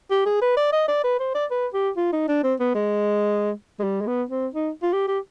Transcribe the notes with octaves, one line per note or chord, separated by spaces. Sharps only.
G4
G#4
B4
D5
D#5
D5
B4
C5
D5
B4
G4
F4
D#4
D4
C4
B3
G#3
G#3
G3
G#3
B3
C4
D#4
F4
G4
G4